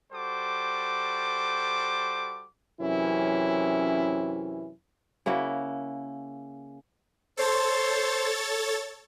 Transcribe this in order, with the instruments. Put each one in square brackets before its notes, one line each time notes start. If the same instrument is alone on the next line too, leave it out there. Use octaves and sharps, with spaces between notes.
[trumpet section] G3 F#4 A4 C5 D6
[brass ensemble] F#2 C3 E3 C#4 E4
[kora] C#3 A#3 E4 F#4
[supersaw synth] A4 C#5 A6 [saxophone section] C5